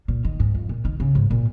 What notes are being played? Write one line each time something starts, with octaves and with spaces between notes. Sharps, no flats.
A#2
D#3
G#2
F2
A#2
D#3
C#3
G#2
A#2